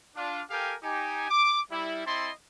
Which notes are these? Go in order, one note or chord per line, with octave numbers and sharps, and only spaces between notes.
D4 F4
G4 A4 A#4 F5 G5 G#5
D#4 G4 G#5
D6
G3 E4
C4 E4 D#5 A5 C6